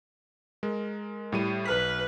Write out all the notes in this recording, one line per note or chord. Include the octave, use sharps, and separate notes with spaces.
G#3 A#4
A2 G3 D#7
B1 B4 F6 B6